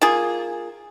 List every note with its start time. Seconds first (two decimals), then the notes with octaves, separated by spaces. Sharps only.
0.02 A#3 F4 G#4